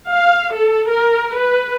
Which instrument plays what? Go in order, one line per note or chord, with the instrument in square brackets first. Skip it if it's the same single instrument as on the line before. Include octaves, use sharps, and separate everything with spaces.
[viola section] F5
A4
A#4
B4